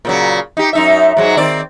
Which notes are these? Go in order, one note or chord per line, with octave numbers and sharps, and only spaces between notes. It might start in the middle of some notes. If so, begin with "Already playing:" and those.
A#2 C#3 F#3
D#4 G4
F#2 D#4 E5
G#2 F#3 G#3
D#3 C4 D5